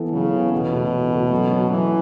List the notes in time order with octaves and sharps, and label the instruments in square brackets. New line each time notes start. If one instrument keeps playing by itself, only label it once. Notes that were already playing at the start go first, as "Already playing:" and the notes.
Already playing: [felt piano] E3 B3 A4
[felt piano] F#2 [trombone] C#3
[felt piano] E3 B3 A4
[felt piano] E2 [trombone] B2
[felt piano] C#3 A3 F#4 A4
E2
C#3 A3 F#4 A4
F#2
F#3 C#4 F#4 A4
[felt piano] F#2 [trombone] E3